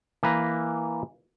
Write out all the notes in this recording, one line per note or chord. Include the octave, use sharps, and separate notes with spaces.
E3 A#3 B4 A#5